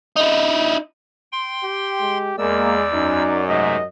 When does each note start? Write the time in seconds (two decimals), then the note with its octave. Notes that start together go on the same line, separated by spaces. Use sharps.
0.16 D#4 E4
1.32 G5 C6
1.63 G4
2.00 G#3
2.38 E2 G#3 A#3 D5 E6
2.93 F#2 D#4
3.48 G#2 C3 A3 D#5